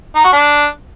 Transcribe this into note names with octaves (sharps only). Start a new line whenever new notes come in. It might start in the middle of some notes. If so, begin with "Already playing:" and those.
D#4
F#4
D4